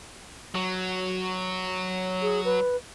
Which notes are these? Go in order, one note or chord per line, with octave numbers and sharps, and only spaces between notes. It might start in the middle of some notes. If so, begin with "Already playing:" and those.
F#3
G#4
B4